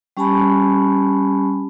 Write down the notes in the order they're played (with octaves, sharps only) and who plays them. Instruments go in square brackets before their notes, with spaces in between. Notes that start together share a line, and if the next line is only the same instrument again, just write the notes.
[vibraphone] G3 C#4 G4 G#5 A5 B5